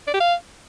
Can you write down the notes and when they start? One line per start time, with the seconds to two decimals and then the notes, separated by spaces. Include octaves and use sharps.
0.07 D5
0.14 G4
0.20 F5